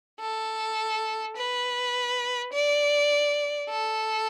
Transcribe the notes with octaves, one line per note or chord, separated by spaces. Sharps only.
A4
B4
D5
A4